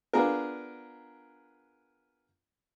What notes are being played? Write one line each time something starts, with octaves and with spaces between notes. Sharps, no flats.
B3 D4 F4 G#4 A#4